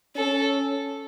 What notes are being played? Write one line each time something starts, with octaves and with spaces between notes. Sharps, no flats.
C#4 A4